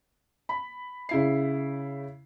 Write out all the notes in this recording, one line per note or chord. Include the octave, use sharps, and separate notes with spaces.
B5
C#3 E4 C7